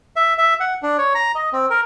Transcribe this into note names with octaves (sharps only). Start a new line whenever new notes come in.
E5
E5
F#5
D4
C#5
A#5
D#5
C4
A#4